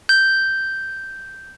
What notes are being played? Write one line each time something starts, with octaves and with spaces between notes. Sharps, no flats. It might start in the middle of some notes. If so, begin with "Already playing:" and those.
G6